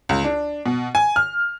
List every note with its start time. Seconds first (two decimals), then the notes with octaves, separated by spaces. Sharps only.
0.09 C#2
0.24 D4
0.66 B2
0.95 G#5
1.16 F6